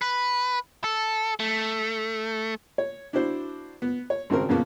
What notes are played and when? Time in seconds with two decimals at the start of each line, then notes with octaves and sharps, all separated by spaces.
0.02 B4
0.84 A4
1.40 A3
2.78 C#5
3.13 D4 E4 F#4 C5
3.82 B3
4.10 C#5
4.30 G#1 C#3 C4 A#4
4.49 F2 A#2 C#3 A#3 B3